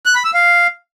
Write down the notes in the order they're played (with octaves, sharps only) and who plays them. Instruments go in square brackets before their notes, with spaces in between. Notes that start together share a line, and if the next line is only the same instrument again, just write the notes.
[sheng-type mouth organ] F#6
B5
E6
F5